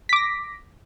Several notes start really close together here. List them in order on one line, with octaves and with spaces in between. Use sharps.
B6 D6 A#6